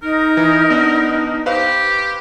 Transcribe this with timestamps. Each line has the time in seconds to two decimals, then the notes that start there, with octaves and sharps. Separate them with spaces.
0.03 D#4 A#4
0.37 E3
0.70 B3 D4
1.46 G4 B4 C5 F5